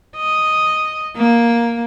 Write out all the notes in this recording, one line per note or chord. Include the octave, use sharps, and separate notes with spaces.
D#5
A#3